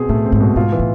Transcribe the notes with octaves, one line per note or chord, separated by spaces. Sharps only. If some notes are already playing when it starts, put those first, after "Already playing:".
Already playing: B2 C4 G#4
A2 A3
C4
G#2
B2
G#2 F4
E3
A2